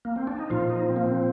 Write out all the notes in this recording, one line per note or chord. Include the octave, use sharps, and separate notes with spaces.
A#3
C4
D4
D#4
A#2 F3 F4
D#4
C4
A#3
C4